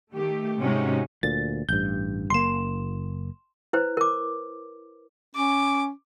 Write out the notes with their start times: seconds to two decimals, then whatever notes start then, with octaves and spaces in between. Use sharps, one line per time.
0.14 D#3 A3 G4
0.59 G#2 C3 G#3 C#4 D#4 F#4
1.23 D2 A#2 A6
1.69 A1 G2 G6
2.30 F#1 A#3 C6 E7
3.73 E4 B4 C5
3.97 A#4 D6
5.35 C#4 D6